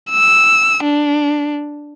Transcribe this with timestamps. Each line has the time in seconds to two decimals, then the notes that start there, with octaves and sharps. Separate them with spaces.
0.10 E6
0.83 D4